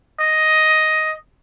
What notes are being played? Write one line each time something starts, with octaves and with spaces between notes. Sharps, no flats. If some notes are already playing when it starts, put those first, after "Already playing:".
D#5